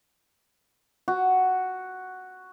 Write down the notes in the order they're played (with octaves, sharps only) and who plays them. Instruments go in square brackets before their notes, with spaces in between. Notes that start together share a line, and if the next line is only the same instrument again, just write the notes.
[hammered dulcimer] F#4